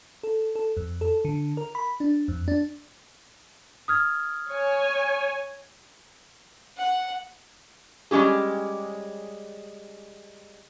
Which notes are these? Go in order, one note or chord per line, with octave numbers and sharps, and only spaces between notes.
A4
A4
F2
A4
D3
A#4
B5
D4
F2
D4
D#6 F6 G#6
C#5 G#5
F#5
G3 G#3 C#4 G4 G#4